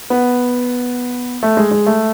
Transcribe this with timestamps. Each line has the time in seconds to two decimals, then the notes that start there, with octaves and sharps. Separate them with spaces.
0.10 B3
1.43 A3
1.57 G#3
1.71 G#3
1.87 A3